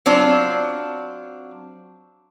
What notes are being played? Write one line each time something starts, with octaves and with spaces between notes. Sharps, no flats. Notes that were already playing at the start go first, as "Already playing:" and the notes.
F#3 C4 D4 F4